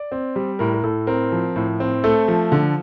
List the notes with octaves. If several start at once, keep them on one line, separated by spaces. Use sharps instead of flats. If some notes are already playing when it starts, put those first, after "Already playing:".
Already playing: D5
C4
G3
A2 A#4
A#4
A2 A4
C4 A#4
F3
A2
C4
A3 A4
F3
D3